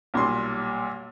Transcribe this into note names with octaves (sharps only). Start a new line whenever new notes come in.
B1 A#2 G3 C6